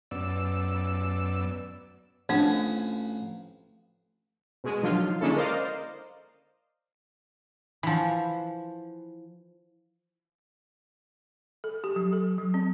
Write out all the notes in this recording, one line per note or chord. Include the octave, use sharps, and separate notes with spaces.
F#2 B3 D5 E6
A1 F3 C4 D4 F#5 D#6
B2 G#3 D#7
D3 D#3 F3 F#3 F4
D3 G#3 A#3 C#4 E4 A4
A#4 C5 D5 D#5 F5
E3 F3
A4
G4
F#3
A4
F#3
C4